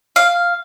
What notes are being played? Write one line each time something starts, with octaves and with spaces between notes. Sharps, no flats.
F5